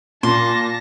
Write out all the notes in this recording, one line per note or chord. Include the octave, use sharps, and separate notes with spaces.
A#2 A5 C6 A#6